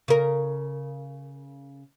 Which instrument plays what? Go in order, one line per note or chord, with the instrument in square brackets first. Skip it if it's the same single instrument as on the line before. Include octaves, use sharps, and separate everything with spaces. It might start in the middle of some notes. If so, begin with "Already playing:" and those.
[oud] C#3 A#4